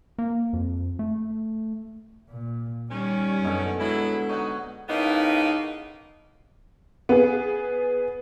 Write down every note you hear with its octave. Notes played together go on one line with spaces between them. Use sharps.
A#3
F2
A3
A#2
D#3 G3 C#4
F#2 B2 D3
F#3 G#3 E4
D#4 C#5 F#5
A2 C#3 A#3 B3 D#4
B3 G#4